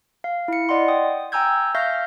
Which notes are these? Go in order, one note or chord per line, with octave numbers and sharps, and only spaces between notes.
F5
E4 C#7
D5 D#5 F#5 C6
G5 D#6
G5 G#5 A#5 E6 G6 G#6
E5 F5 C#6 F6 G6 A#6